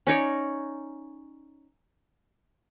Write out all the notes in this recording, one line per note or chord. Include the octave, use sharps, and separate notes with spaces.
C#4 D#4 C#5 D5